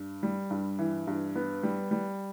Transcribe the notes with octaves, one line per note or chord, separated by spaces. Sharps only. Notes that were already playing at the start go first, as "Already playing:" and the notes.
Already playing: G2
G3
G2
E3
G2
B3
G3
G3